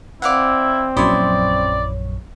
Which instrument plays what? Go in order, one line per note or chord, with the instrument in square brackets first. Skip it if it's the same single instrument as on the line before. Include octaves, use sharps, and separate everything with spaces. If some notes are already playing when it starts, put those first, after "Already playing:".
[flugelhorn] C4 [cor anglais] E4 [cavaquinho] D5 F5 F#5
[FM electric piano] A#1 F#2 C#5 [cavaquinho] E4 C6 D#6 [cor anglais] D5